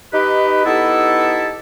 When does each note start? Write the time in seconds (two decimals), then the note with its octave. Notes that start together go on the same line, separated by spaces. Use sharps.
0.13 D#4 G4 B4
0.65 B3 D#4 E4 G4 A4